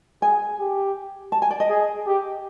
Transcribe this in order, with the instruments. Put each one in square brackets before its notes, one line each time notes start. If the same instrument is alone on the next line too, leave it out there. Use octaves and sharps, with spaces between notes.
[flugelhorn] G#4 [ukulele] G#5
[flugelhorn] G4
[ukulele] A5
G#5
D5
D#5
[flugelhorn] G#4
G4